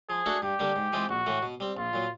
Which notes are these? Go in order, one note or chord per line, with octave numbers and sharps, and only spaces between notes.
F3 G#4
A3 D4 F#4 A4
G2 G4
D3 G3 A#3
G#2
E3 G#3 C4 F4
A#1 F#4
A2 E3 A3
B2
G3 C4
A#1 F4
A#2 F#3